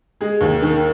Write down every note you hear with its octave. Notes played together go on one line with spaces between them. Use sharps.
G#3 G#4
D#2
D#3